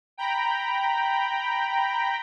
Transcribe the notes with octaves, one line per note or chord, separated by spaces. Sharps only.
G5 A#5 B5